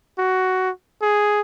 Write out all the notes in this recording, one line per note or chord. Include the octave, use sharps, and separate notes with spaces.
F#4
G#4